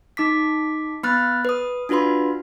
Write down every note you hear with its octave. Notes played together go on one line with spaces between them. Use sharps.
D#4 D6 B6
B3 B5 F6 F#6 A6
B4 D#6
D4 F4 F#4 B4 B5 C6